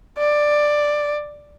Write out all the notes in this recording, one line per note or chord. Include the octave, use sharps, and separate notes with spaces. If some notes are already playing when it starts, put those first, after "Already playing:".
D5